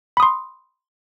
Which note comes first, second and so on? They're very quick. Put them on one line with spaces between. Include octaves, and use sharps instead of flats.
B5 D#6 C6